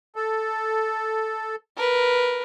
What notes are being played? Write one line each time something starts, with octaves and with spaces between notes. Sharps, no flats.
A4
A#4 B4